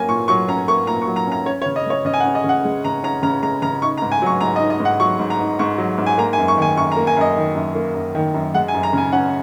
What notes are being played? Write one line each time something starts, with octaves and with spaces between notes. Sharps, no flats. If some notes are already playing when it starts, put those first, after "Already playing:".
Already playing: F#3 A#3 C#4 G#5
A#2 C#6
F#3 C#6
C#4 A#5
A#3 C#6
A#2 A#5
C#6
F#3
A#5
C#4 A#5
C#4 C#5
C#5
C#3
D#5
G#3 C#5
C#3 D#5
G#5
F#5
C#4
D#5
C#3
F#5
G#3
C#3 A#5
C#4 A#5
C#3 A#5
G#3 A#5
C#3 A#5
D#4 C#6
A#5
G#2
G#5
F#3 C#6
G#2 A#5
D#5
D#4
D#5
G#2
F#5
F#3 C#6
G#2
A#5
D#4
G#2 C#6
F#3
G#2
G#5
A#3 A#5
G#5
F#2
C#6
D#3 G#5
F#2 C#6
A#5
A#3
G#5
F#2 D#5
D#3
F#2
A#3
F#2
D#3
F#2
G#3 F#5
G#5
F#2
A#5
C#3 G#5
C#4 F#5